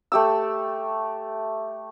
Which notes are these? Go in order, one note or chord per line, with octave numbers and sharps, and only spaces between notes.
A3 G4 E6